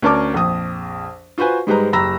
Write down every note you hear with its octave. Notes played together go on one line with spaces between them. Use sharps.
D2 C#4 A#4 D5 A5 D6
A#1 F2 D#6
F4 F#4 B4 C5 G#5
G#2 G3 G#3 B4 C5 A#5
F#1 G4 A#5 B5 E6 A#6